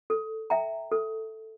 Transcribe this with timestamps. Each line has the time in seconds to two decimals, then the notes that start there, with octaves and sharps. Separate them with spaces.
0.10 A4
0.50 E5 G5 A#5
0.92 A4